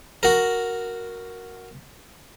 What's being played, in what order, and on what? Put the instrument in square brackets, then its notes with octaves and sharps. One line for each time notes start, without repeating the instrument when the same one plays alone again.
[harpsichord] F#4 A#4